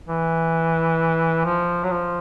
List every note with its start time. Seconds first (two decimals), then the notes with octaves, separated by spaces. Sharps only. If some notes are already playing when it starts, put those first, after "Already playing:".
0.08 E3
1.45 F3
1.83 F#3
1.91 F3